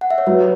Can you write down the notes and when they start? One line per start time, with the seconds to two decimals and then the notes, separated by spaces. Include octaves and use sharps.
0.01 F#5
0.10 E5
0.18 C#5
0.27 F#3 B4